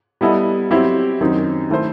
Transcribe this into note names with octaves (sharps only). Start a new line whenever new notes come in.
G3 B3 E4 A4 D#5
F#3 C4 E4 G4
F#2 D#3 F#3 C4 D#4
D#3 A3 E4 A4 C5